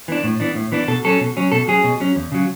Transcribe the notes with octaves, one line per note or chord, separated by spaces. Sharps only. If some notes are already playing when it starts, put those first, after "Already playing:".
E3 B3 D4
A2
E3 B3 D4
A2
E3 B3 D4
B2 A4
F#3 C#4 A4
B2
F#3 C#4
B2 A4
F#3 C#4 G#4
B2
F#3 C#4
E2
C#3 F#3